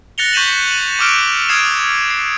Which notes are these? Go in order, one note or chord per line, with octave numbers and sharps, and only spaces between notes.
F#6 A6 A#6 C#7 F7 G7
C#6 G6 B6 D#7 E7 F#7
D#7 F#7
C#6 D6 E6 F6 D7 E7
D#6 F6 G#6 C7 D7 E7
C7